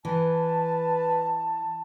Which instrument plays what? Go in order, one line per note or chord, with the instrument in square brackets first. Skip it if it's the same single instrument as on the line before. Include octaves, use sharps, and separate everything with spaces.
[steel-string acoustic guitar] E3 [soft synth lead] B4 [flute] A5